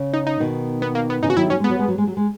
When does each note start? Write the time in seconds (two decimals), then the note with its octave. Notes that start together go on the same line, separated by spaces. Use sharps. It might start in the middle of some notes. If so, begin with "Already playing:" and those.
Already playing: C#3
0.13 D#4
0.27 D#4
0.40 B2 D#3
0.82 B3
0.95 A#3
1.10 B3
1.23 C#3 E3 D#4
1.30 F#4
1.37 D#3 F#3 E4
1.50 F#3 C#4
1.60 G#3 B3
1.70 F#3
1.79 G#3
1.88 F#3
1.98 G#3
2.07 F#3
2.17 G#3